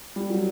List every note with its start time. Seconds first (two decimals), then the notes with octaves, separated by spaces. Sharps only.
0.16 G3
0.30 F#3